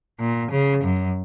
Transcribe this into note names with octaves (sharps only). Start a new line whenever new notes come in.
A#2
C#3
F#2